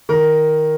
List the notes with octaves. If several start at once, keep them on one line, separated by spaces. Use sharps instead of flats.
D#3 A#4